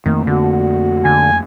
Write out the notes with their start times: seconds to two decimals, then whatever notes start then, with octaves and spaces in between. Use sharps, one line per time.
0.06 F2 D#3 A3 A#3
0.27 D3 F#4
1.05 D3 G#5